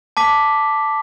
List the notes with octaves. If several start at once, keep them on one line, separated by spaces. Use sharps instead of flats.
A5 D6 B6